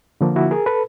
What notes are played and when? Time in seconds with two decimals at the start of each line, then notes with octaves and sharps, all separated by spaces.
0.21 D3 F3 A#3
0.36 E4 F#4
0.51 G#4 A#4
0.66 A4 B4